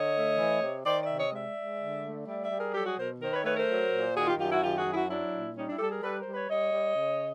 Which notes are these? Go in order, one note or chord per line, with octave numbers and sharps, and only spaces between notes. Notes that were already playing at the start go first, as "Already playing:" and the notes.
Already playing: D3 C#5 D#5
A3
E3
C3
D#3 C5 D5
D5 E5
C3
C#5 D#5
G#3 D5 E5
G#3
D3
A3
G3 D5 E5
D5 E5
G3
G#4 A#4
F#3 G4 A4
F#4 G#4
B2 A#4 C5
D#3 A#4 C5
B4 C#5
A3 B4 C#5
A#4 C5
F#3
A#2
D#3 F#4 G#4
F4 G4
F#2 F4 G4
E4 F#4
D#3 F4 G4
F#4 G#4
F#2
E4 F#4
F#3 D4 E4
A#2
G3 C#4 D#4
D4 E4
G3 G4 A4
G#4 A#4
G3 A4 B4
A#4 C5
G3
B4 C#5
G3 C#5 D#5
G3
C#3